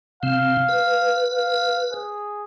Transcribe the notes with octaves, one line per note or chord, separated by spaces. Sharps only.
C3 C4 F5
B4
F5
G#4